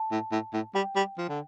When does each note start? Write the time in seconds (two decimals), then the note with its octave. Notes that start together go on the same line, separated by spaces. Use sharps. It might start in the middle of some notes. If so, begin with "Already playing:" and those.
Already playing: A5
0.12 A2
0.32 A2
0.54 A2
0.75 G3 G5
0.96 G3
1.18 F3
1.29 D3